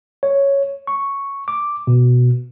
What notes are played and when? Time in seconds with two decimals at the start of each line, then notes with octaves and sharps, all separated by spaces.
0.23 C#5
0.87 C#6
1.48 D6
1.87 B2